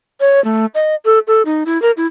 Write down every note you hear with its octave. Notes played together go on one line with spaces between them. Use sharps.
C#5
A3
D#5
A4
A4
D#4
E4
A#4
E4